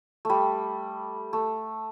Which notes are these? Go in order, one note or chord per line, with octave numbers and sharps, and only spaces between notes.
G3 A3
A3